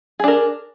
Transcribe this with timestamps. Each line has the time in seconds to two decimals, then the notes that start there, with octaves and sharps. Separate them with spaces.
0.20 G#4
0.24 D4
0.28 A#4